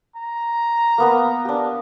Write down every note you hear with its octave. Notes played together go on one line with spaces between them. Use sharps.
A#5
A#3 B3 B4
D4 G4